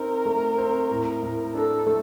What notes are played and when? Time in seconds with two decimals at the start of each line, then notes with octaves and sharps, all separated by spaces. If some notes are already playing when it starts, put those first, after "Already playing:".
Already playing: C4 D#4 A#4
0.26 A3
0.58 C4
0.90 A2
1.23 A2
1.54 D4 A4
1.87 A3